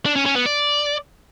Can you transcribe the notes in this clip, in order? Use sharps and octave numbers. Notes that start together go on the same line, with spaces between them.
D4
C#4
C#4
B3
D5